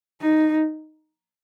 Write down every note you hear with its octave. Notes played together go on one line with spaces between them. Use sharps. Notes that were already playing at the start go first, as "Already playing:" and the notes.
D#4